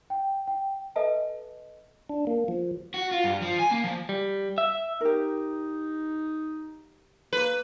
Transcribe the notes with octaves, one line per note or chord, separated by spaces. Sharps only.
G5
G5
A4 B4 D#5 E5 G#5 A5
D4
A#3
F3
F#4
F4
G2
F3
G#5
A#3
F3
G3
E5
D#4 G4 A#4
A#3 B4